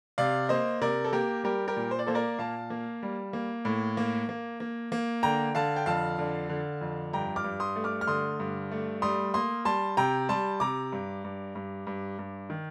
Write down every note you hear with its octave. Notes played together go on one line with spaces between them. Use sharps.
C3 D5 F5
A#3 C5 D#5
C3 A#4 D5
A4
A#3 G4 A#4
G3 G4 A#4
G4 A#4
A#2
C5
D5
A#3 A4 C5
A#4 D5
A#2 F5 A5
A#3
G3
A#3
A2
A#3
A#3
A#3
A#3
D3 G5 A#5
D3 F5 A5
G5
F2 F5 A5
D3
D3
F2
G2 G5 A#5
D6 F6
G2
C6 D#6
A3
D6 F6
F6
D3 C6 D#6
G2
A3
G3 C6 D#6
A#3 C6 D#6
G3 A5 C6
C3 G5 A#5
G3 A5 C6
C3 A#5 D6
G2
G2
G2
G2
G2
D#3